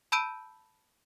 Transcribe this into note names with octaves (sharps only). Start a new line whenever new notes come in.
A5 B5 E6 G6 D7 D#7